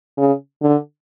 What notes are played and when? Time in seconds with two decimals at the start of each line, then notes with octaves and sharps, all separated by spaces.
0.18 C#3
0.62 D3